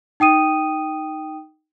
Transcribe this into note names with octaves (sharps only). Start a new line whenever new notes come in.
D#4 G5 D#6 D#7